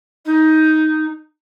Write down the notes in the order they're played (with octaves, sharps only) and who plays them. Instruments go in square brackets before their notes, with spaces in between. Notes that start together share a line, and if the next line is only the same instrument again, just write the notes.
[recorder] D#4